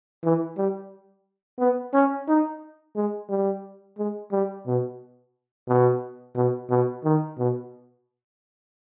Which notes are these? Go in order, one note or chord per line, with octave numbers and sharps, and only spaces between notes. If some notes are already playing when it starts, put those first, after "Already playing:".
E3
G3
B3
C#4
D#4
G#3
G3
G#3
G3
B2
B2
B2
B2
D#3
B2